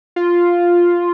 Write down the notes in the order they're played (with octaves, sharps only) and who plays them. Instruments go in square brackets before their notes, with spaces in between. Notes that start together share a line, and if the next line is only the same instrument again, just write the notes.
[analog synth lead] F4